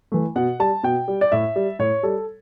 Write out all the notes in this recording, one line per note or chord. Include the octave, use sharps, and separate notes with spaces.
E3 A3
B2 F#5
G3 A5
B2 G5
G3
D5
A2 E5
G3
A2 C#5
G3 A4